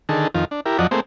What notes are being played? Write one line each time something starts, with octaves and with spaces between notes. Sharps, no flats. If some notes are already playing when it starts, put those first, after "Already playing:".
D3 D#3 G#4 A4
F2 D#3 F4
D4
E4 G4 A#4
F2 F3 F#3 D5 D#5 F#5
A3 A#3 C4 G#4 C5